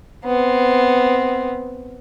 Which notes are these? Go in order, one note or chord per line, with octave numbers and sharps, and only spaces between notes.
B3 C4